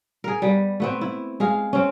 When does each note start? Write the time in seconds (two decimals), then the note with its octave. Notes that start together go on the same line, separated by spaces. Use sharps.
0.24 G#4 A#4
0.42 G3 B3
0.80 A3 B3 C4
1.01 E4
1.40 G#3 G#4 F5
1.73 C4 C#4